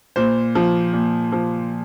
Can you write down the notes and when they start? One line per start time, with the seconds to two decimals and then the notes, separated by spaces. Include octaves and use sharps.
0.16 A#2 C5
0.55 F3
0.93 A#2
1.32 F3